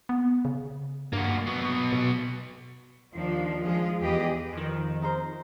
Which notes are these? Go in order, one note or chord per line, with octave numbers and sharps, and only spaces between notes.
B3
C#3
G2 A#3 F#4
F#3 B3
B2
D#2 D#3 F3 D4
F3 G#3 F4 G#4
E2 G4 G#4 B4 D#5
F2 D#3
D#4 A#4 C5